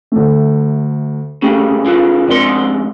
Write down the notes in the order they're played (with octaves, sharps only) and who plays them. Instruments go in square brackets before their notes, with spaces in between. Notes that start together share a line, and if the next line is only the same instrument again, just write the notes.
[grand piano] D2 A3
[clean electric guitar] C2 C#3 [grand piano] A3 G4
[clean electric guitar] C#3 E3 [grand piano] F4
[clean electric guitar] F2 G#2 C6 [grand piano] C4 D4 A#4